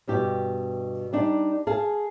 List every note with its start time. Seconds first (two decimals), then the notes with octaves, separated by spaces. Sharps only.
0.08 G2 B2 G4
1.13 G3 D4 D#4
1.67 G#4 F5 A5